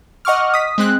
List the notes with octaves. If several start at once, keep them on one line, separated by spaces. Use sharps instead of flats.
D#5 F#5 C#6 D6 F6
D#6 B6
G#3 C4 F#6